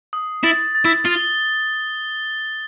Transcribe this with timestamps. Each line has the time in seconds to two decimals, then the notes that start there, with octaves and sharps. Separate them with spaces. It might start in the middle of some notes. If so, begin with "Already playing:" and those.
0.13 D#6
0.44 E4 A6
0.75 A6
0.85 E4
1.05 F4 G7